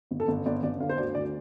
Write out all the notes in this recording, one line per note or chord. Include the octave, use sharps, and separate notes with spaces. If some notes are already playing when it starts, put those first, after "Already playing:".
G1
A4
G1
G1 D5
G1 D5
D3 F5
C5
D2 D5
D2 D5